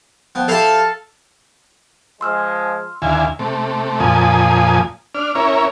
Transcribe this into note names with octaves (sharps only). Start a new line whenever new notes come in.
F3 B3 G5
F3 E4 G4 A4 F5 A5
F3 G#3 C6 E6 F6
D#2 D3 E4 F5 G#5
C3 A3
F2 A#2 F3 G#5 D#6
D4 F6
C#4 E4 A#4 C#5